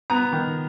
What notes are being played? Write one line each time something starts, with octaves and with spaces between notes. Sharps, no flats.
B3 A#5
D#3